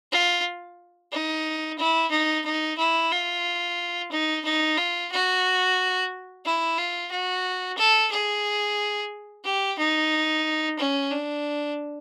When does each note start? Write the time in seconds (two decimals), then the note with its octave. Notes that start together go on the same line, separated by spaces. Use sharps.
0.12 F4
1.11 D#4
1.78 E4
2.11 D#4
2.45 D#4
2.78 E4
3.11 F4
4.12 D#4
4.44 D#4
4.77 F4
5.12 F#4
6.45 E4
6.77 F4
7.11 F#4
7.77 A4
8.12 G#4
9.44 G4
9.78 D#4
10.78 C#4
11.11 D4